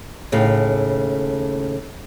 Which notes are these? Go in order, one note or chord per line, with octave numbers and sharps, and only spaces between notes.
D#2 A2 C#3